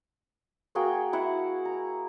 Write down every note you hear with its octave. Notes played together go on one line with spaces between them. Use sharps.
A#3 F#4 G#4 G5
E4 F#5
A#5